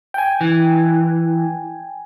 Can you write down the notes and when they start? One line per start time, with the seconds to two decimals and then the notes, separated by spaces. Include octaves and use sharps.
0.14 G5 G#5
0.41 E3